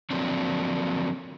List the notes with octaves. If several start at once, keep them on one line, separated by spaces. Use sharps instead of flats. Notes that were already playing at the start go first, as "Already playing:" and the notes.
D3 F3 F#3 A#3 C4 D4